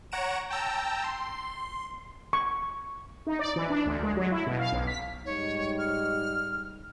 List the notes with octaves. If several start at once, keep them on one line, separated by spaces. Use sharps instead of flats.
C#5 F#5 A#5 D7 E7
G5 A5 A#5 E6
C6
C#6
D#4
D5
E3
D4
D2
G#3
F#3
E4
B2
F5
B1
B6
G#2 G3 D#4 C#5
F6